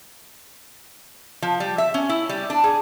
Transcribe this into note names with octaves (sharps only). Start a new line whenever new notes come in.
F3
G3
E5
C#4
E4
G3
D4
G#4